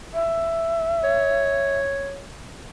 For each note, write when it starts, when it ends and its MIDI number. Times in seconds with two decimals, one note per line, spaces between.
0.14 1.78 76
1.04 2.22 73